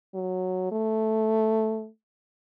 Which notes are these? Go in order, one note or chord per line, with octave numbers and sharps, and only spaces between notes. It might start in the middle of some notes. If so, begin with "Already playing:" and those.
F#3
A3